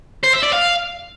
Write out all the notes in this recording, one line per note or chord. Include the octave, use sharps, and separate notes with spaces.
C5
E5
D5
F5